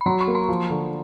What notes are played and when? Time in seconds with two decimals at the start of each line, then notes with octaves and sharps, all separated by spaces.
0.01 B5
0.06 F#3 A#5 C6
0.20 B5 C#6
0.27 A#3
0.35 A#5 C6
0.49 F3
0.70 D3